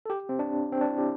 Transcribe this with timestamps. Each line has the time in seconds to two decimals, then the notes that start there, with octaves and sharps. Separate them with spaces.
0.06 A4
0.10 G4
0.29 C4
0.39 D4
0.72 C4
0.81 D4
0.90 E4
0.98 G4